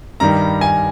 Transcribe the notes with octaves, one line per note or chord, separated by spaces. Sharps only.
G2 D#3 G3 A#5
G#5